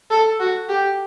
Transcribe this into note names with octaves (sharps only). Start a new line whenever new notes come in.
A4
F#4
G4